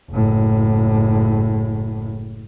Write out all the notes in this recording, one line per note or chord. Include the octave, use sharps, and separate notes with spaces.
F#1 A2